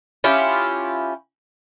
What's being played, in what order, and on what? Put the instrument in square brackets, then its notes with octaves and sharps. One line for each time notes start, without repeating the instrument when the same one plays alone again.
[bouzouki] C#4 E4 F4 G4